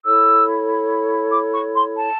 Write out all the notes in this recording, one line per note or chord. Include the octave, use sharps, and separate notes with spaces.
E4 A4 C#5 E6
D6
C#6
C6
A5